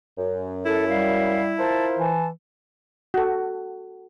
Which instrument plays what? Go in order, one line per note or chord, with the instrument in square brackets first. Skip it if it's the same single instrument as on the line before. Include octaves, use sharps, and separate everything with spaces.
[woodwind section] F#2
[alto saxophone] E4 [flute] A4
[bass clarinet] G3 [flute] F5
[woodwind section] F4 A#4 C5 [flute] A5
[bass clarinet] E3 [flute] A5
[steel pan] F#4 A4